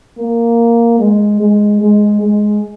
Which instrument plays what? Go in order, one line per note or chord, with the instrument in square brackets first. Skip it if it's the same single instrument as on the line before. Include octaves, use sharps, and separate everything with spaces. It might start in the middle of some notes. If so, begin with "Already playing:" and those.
[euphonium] A#3
G#3
G#3
G#3
G#3